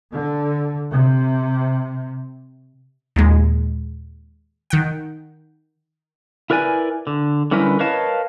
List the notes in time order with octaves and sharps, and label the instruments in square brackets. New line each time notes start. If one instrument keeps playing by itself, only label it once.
[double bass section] D3
C3
[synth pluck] D#2 A#2 G#3
D#3 F#5 G5
[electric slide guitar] E4 A#4 B4 D5 G#5
D3
D3 G3 C#4 E4 A#4 B4
A#4 B4 C#5 D#5 F5 A5